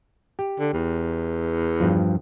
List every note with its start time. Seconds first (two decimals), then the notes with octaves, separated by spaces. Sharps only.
0.39 G4
0.59 D3
0.73 E2
1.80 G2 F3